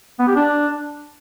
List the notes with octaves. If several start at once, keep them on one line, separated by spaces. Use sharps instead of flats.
B3
G4
D4